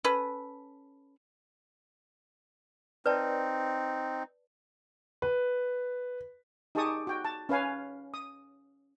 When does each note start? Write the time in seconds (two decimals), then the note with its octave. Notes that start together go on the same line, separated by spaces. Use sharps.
0.04 C#4 A4 B4
3.06 C4 D#4 B4 D5 A5
5.22 B4
6.75 D#4 G4 G#4 A5 C#6 D#6
7.07 F#4 G5
7.25 A5
7.49 C#4 B4 F5 G#5
8.14 D#6